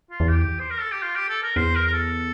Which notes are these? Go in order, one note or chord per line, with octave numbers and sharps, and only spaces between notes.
F4
E2
G4
C5
A#4
A4
G4
F4
G4
A4
A#4
E2 C5
A#4
A#4
A4